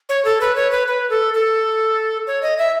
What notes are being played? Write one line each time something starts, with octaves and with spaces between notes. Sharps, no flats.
C#5
A4
B4
C#5
B4
B4
A4
A4
C#5
D#5
E5